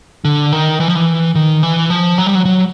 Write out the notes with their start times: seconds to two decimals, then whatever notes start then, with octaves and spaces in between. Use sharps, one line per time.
0.25 D3
0.52 D#3
0.80 E3
0.88 F3
0.95 E3
1.35 D#3
1.63 E3
1.90 F3
2.18 F#3
2.27 G3
2.35 F#3
2.45 F#3